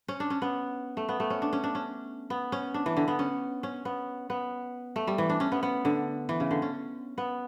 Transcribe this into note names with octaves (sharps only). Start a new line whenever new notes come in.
C#4
D4
C#4
B3
A3
B3
A3
C#4
D4
C#4
D4
C#4
B3
C#4
D4
E3
D3
B3
C#4
C#4
B3
B3
A3
G3
E3
D4
C#4
B3
B3
D3
E3
C#3
D3
C#4
B3